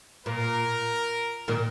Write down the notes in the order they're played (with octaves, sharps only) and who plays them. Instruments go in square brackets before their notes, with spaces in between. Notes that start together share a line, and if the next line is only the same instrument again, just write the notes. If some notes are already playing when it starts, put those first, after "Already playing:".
[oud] A#2 [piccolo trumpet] A#4
[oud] A#2 D#3